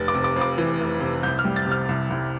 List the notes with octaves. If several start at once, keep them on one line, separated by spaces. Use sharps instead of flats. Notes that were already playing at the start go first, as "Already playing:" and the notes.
Already playing: F1 A6
D6
C3
D6
F2
D6
E3
F1
C3
C2 G6
F6
G3
A6
C3
F6
C2
C2